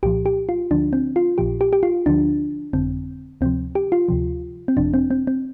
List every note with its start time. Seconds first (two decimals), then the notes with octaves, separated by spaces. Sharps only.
0.03 C2 A#2 F3 G4
0.26 G4
0.49 F4
0.71 D2 D3 F3 D4
0.93 C4
1.16 F4
1.38 A#1 A#2 F3 G4
1.61 G4
1.73 G4
1.83 F4
2.06 D2 D3 F3 D4
2.73 G1 F2 D3 C4
3.41 D2 C3 F3 C4
3.75 G4
3.92 F4
4.08 D2 C3 F3
4.68 C4
4.77 G1 F2 C3 F3 D4
4.94 C4
5.11 C4
5.27 C4